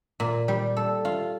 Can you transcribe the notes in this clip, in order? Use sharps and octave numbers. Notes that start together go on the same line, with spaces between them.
A#2
G3
A4
F4